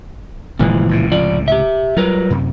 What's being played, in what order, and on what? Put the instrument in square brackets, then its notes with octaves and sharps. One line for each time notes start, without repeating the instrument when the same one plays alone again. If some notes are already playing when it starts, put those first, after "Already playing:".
[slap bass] G1 G#3 [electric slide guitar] A#2 E3 F3
[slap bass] C#2 A2 C3
[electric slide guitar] F3 F4 D5
G4 E5
[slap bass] F#3 G3 [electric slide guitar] F4 A#4 B4
[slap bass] F#2 C3